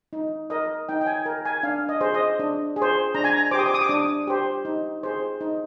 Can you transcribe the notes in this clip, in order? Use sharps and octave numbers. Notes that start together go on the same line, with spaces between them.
D#4
A#4 D#5
D#4 G5
G5
G#5
A#4
G#5
D4 F5
D#5
G#4 C5
D#5
D4
G#4
C5
D4 A#5
G#5
A#5
G4 C5 D6
D#6
D6
D#6
D6
D4 D#6
G4 C5
D#4
G#4 C5
D#4